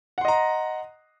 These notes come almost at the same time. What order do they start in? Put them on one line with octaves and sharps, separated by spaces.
F#5 C6 D#5 A#5